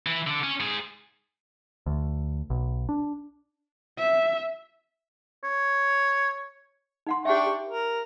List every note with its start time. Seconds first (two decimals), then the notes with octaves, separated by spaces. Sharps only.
0.06 E3
0.27 D3 D4
0.43 C#4
0.60 G#2 G#4
1.86 D2
2.50 B1
2.89 D4
3.99 E5
5.44 C#5
7.07 D#4 F#5 C6
7.25 D4 G4 E5 G5 C#6
7.46 G4
7.68 A#4